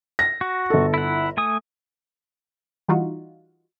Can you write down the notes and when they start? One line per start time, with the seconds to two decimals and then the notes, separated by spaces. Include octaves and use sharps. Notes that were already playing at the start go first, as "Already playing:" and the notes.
0.19 A#6
0.41 F#4
0.70 G1 A4
0.94 E4 F#5
1.37 A3 G#5 D#6
2.88 E3 G3 D#4 F4 F#4